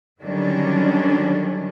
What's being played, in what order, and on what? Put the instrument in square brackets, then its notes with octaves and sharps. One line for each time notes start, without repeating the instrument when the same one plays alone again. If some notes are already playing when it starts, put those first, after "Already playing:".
[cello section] D3 D#3 F#3 G3 C#4 D4